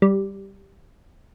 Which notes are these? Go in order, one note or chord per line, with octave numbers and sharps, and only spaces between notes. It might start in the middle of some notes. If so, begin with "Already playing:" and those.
G3